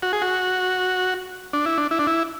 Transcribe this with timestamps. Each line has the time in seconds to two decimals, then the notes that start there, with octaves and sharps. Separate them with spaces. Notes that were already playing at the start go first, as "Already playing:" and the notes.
0.02 F#4
0.13 G#4
0.22 F#4
1.53 D4
1.66 E4
1.78 D4
1.91 E4
1.99 D4
2.07 E4